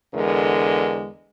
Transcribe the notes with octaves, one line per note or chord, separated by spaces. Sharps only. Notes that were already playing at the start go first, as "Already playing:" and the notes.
E2 D3 G#3 A#4